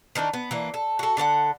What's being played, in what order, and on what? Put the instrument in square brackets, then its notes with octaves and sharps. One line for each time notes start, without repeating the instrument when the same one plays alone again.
[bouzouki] D#3 E3 D4 D#4
B3
E3 A#3 D4
A4
F#4 A4
D3 A4 C#5 F#5